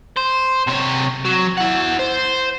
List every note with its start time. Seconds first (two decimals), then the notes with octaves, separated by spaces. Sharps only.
0.17 C5
0.67 C3 C#5
1.25 F#3
1.57 E4 F#5
1.99 C5